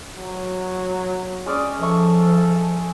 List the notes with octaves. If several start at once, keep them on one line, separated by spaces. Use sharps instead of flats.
F#3
G#3 C#4 D5
F3 A4 E5 C#6